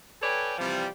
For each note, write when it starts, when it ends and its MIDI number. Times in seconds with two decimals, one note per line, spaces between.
0.22 0.55 69
0.22 0.55 71
0.22 0.55 73
0.22 0.55 74
0.22 0.55 79
0.22 0.55 80
0.59 0.87 48
0.59 0.87 52
0.59 0.87 53
0.59 0.87 55